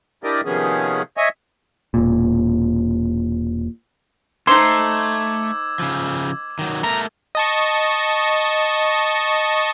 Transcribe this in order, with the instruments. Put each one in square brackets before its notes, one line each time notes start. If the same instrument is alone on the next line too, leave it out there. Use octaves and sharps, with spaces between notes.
[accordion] D4 E4 G4 A#4 D5 D#5
C3 D#3 F3 B3 C#4 G#4
C#5 D#5 E5 G#5
[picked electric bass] E1 A#2
[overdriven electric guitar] A3 [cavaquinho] D#4 C5 C6 [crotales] D6 E6 G#6
[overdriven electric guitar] C#3 F3
D#3 F#3
[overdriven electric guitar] A3 A#4 [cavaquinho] A#5
[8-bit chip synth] D#5 A5 C#6